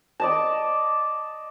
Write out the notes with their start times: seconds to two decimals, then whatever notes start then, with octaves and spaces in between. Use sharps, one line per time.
0.20 D5 D#5 A5